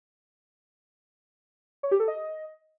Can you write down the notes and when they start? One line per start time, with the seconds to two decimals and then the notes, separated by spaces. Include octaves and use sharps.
1.83 C#5
1.91 G4
2.00 A4
2.08 D#5